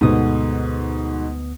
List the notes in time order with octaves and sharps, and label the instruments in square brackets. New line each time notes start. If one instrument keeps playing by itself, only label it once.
[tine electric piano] D2 B3 D#6 [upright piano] G#2 B2 A3